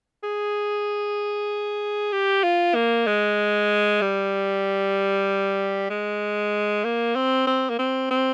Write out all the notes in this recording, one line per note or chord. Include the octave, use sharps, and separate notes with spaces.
G#4
G4
F4
A#3
G#3
G3
G#3
A#3
C4
C4
A#3
C4
C4